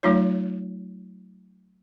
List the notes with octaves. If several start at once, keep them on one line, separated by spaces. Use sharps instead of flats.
F#3 A3 D#4 F4 C#5